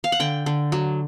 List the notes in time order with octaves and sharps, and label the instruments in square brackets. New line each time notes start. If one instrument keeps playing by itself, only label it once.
[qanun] F5
F#5
D3 G5
D3
F#3